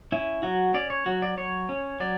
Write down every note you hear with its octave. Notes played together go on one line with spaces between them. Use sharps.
C#4 E4
F#3 F#4
C#4 D5
C#5
F#3 F#4
D5
F#3 C#5
C#4
F#3 D5